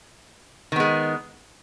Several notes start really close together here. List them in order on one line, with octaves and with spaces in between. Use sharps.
D#3 B3 G#3